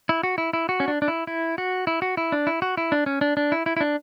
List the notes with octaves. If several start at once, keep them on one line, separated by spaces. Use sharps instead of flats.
E4
F#4
E4
E4
F#4
C#4
D4
D4
E4
E4
F#4
E4
F#4
E4
D4
E4
F#4
E4
D4
C#4
D4
D4
E4
E4
E4
D4